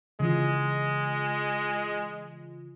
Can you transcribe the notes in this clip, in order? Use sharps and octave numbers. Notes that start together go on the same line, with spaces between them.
C#3 E3 G#3 F4